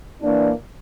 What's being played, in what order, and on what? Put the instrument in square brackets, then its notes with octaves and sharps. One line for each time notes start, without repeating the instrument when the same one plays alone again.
[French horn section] E3 A#3 D4